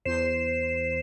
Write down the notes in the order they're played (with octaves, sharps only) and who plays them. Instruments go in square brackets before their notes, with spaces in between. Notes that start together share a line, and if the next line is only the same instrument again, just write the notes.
[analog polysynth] E2 C5 C7 E7